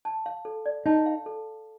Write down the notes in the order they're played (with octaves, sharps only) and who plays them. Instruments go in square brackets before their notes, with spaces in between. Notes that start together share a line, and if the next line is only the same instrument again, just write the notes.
[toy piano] A5
F5
A4
D5
[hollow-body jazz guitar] D#4 [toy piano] A5
[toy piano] F5
A4